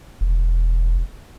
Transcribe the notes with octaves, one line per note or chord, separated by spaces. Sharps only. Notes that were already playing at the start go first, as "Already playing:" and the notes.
E1